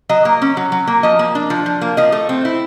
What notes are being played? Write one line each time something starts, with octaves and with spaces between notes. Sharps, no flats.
F#3 D#5
A#3
C#4
F#3
F#3
A#3
F3 D#5
A#3
D4
F3
F3
A#3
F3 D#5
A3
C4
E4